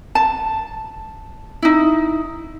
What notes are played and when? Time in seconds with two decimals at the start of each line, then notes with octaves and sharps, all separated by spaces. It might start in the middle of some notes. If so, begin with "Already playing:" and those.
0.15 A5
1.62 D#4 E4